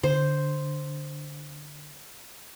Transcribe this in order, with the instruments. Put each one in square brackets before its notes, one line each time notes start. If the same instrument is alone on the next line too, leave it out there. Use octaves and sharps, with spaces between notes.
[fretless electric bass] D3 [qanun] C5